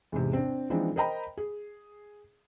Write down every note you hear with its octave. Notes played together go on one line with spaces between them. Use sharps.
E2 G#2 C3
C4 D4
E3 F3 G#3 C4 D4 D#4
A#4 C5 D#5 G5 A#5 B5
G#4